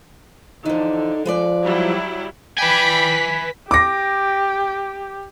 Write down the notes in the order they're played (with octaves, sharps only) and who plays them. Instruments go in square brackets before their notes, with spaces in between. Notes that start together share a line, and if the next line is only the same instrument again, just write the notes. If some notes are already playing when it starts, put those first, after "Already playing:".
[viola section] D3 [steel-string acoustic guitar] E3 F3 [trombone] D#4
[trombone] F3 [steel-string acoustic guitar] G#3 B4 D5
[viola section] F#3 G3 E4
[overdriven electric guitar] B4 G#5 [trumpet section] D5 G5 B5 [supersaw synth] B6
[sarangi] G4 [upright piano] D6 A#6